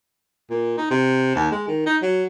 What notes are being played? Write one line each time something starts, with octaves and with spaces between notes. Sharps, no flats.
A#2
D#4
C3
D#2
G#3
D#3
D#4
F#3